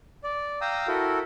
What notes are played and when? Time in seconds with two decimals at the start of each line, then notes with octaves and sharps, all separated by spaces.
0.24 D5
0.61 F5 G5 A#5 D#6 E6
0.88 E4 F#4 A4 A#4